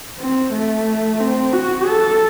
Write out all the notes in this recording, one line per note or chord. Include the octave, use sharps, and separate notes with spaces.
C4
A3
C4
F#4
A4